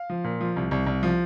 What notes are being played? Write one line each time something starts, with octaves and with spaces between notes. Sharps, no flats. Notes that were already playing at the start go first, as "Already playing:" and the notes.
Already playing: F5
F3
A#2
F3
C2
C2
C2
F3